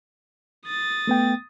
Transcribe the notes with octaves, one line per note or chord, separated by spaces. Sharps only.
D#6 A6
A3 B3 G5